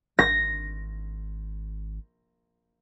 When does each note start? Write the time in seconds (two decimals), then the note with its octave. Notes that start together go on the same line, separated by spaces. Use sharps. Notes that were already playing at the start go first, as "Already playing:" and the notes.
0.19 G#1 A#6